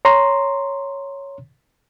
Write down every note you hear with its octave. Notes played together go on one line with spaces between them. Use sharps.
C#5 A#5 C6